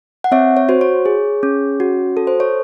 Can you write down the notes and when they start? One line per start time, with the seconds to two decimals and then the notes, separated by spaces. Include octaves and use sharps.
0.24 F#5
0.32 C4 C#5 E5
0.57 C#5
0.69 F#4 C5
0.81 C#5
1.06 G#4
1.43 C#4
1.80 F#4
2.17 A4
2.27 C5
2.40 C#5